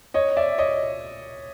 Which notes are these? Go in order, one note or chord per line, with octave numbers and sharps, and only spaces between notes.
C#5 D#5
D5 E5
C#5 D#5